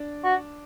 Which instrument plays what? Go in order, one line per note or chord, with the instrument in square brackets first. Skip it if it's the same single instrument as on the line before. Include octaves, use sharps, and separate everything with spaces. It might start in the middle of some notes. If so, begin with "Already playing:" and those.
Already playing: [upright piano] D4
[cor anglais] F#4